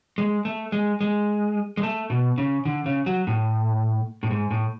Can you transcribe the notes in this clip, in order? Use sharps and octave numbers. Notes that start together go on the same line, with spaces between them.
G#3
A3
G#3
G#3
G#3
A3
B2
C#3
D3
C#3
F#3
A2
A2
G#2
A2